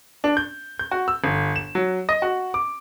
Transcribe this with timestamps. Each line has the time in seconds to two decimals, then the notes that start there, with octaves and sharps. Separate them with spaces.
0.24 D4
0.37 G6
0.79 G6
0.91 F#4
1.08 E6
1.24 G1
1.56 E7
1.75 F#3
2.09 D#5
2.22 F#4
2.54 D6